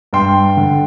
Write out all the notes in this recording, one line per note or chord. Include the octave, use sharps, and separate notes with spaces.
G2 G5 C6
D3